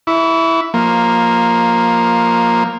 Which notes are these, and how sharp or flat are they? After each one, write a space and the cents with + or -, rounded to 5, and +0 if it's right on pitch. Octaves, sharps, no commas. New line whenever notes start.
E4 +0 C#6 +45
F3 +10 A#3 +0